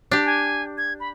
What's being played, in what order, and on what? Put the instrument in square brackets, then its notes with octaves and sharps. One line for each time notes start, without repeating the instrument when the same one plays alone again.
[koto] D4 G4
[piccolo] G#5
G#6
B5